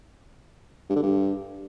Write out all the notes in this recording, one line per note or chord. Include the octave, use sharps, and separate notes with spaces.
G2
D3
G2